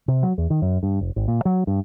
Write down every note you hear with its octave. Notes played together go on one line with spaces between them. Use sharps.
C3
F#3
E2
D#3
F#2
G2
F1
G#1
A#2
F#3
G2